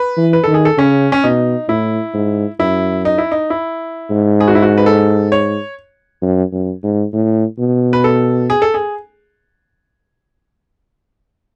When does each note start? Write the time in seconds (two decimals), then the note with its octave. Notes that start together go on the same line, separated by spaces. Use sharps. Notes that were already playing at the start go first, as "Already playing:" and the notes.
Already playing: B4
0.17 E3
0.33 B4
0.44 D#3 A4
0.54 G#4
0.65 A4
0.78 C#3 C#4
1.12 C#4
1.24 B2 D#4
1.68 A2 E4
2.14 G#2
2.60 F#2 E4
3.05 D#4
3.18 E4
3.32 D#4
3.50 E4
4.11 G#2
4.40 G#4
4.48 F#4
4.55 E4
4.62 F#4
4.78 B4
4.86 A4
5.32 C#5
6.22 F#2
6.52 F#2
6.83 G#2
7.13 A2
7.59 B2
7.93 B4
8.04 A4
8.50 G#4
8.62 A4
8.74 G#4